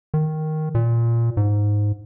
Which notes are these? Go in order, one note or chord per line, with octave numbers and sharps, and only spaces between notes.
D#3
A#2
G#2